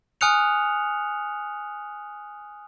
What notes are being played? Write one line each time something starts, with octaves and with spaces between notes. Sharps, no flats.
G#5 D#6 F6 F#6 C#7 F7